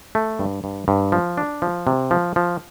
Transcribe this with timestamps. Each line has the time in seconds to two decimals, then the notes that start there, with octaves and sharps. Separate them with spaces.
0.15 A3
0.39 G2
0.64 G2
0.88 G2
1.12 F3
1.38 D4
1.62 F3
1.87 C3
2.11 F3
2.36 F3